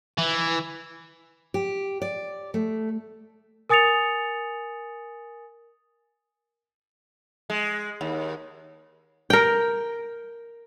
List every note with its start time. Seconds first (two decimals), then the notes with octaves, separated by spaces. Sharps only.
0.18 E3
1.54 G4
2.02 D5
2.54 A3
3.69 A#4 G#5 D#6 A6 C#7 F7
7.50 G#3
8.01 D#2
9.30 A#4 G5